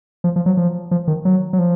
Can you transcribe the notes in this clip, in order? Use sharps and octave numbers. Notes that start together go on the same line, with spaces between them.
F3
F3
F#3
F3
F3
D#3
F#3
F#3
F3